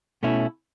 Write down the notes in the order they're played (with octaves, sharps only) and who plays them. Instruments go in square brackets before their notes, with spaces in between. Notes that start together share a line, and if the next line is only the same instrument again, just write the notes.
[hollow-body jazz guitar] B2 A3 C#4 E4